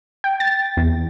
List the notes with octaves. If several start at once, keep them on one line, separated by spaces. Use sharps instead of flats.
G5
A6
E2